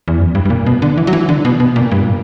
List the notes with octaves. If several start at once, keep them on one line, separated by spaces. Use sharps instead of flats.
E2
F#2
G2
G2
A#2
B2
D3
E3
F#3
E3
D3
B2
B2
A#2
G2
A#2